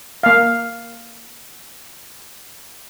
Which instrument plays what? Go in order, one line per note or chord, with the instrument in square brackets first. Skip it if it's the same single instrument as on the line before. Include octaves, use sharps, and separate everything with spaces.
[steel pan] A#3 F5